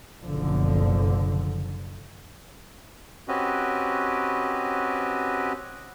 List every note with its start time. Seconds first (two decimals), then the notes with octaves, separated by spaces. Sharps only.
0.23 F#1 B1 D3 F3
3.28 C4 C#4 F#4 G4 B4 D#5